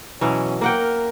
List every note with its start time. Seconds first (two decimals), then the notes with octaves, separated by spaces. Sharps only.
0.21 B2 E3 F#3 C#4
0.61 A#3 A#4 F#5 G5